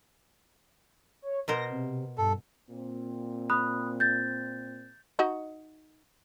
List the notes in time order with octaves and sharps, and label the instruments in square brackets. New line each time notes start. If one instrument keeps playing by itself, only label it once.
[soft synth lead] C#5
[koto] B2 A#4 C5 [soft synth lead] A#6
[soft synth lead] C3
[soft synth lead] G2 [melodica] A4
[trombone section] A#2 C4
[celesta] B5 D#6 F#6
G6 A6
[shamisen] D#4 F#4 D#5